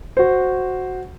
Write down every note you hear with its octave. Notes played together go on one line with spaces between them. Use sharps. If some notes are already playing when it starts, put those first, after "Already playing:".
F#4 C5